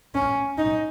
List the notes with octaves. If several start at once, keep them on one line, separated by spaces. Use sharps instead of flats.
C#4
D#4